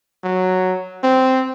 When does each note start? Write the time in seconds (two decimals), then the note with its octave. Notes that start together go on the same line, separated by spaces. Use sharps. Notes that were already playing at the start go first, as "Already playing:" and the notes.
0.24 F#3
1.03 C4